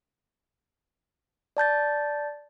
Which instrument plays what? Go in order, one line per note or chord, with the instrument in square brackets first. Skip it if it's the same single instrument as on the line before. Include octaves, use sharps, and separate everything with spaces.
[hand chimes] D5 A5 G6 A6